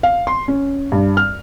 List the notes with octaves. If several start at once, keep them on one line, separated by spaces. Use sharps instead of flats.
F5
C6
C#4
G2
F6